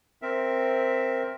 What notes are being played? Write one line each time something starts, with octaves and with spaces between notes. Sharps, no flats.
C4 A#4 E5